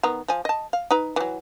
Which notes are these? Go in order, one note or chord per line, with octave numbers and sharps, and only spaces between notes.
D#3 B3 A#5
F3 G#5
D#5 A5
F5
D#4 B4 A#5
E3 F#3